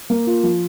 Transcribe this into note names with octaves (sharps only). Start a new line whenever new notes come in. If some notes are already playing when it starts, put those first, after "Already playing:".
A#3
F4
F3